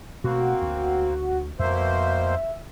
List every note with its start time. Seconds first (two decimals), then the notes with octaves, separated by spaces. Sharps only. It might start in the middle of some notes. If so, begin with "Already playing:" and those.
0.24 B2 A3 A#3 C4 F#4
0.62 D2
1.59 F2 B2 A#3 C5 E5